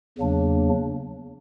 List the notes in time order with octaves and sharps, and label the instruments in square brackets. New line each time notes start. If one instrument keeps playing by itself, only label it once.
[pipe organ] E2 C#3 F#3 A#3 D4